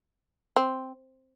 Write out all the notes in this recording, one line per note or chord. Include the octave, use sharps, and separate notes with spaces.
C4